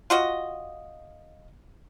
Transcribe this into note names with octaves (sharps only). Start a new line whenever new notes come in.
F4 F#4 D#5